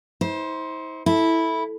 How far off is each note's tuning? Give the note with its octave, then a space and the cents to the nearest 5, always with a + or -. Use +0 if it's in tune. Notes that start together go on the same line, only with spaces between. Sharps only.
E4 -45 C5 +10
E4 -10 A4 +0